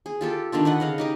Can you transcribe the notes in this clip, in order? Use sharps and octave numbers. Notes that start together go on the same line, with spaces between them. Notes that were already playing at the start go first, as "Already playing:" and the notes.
G#4
F4 G4 A4
D3 D#3 D4 F4
B4 D#5 F#5
C#3 D#5 F5
D#4 G4 D#5